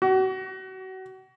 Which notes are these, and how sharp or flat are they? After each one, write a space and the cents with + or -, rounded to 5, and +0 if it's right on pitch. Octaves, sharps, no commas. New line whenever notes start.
F#4 +30